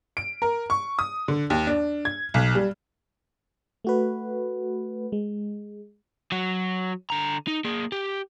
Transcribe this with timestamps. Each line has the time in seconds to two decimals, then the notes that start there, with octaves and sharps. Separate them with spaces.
0.17 D7
0.42 A#4
0.70 C#6
0.99 D#6
1.28 D3
1.50 D#2
1.67 D4
2.05 G#6
2.34 B1
2.55 G3
3.84 A3 F#4 B4
5.12 G#3
6.32 F#3 F#4
7.10 D3 A#5
7.47 D#4
7.65 A#3 G#4
7.92 G4